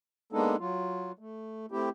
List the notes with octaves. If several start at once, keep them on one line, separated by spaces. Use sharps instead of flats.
G#3 A#3 B3 D4 D#4 A4
F#3 F4
A3
A3 C4 E4 G4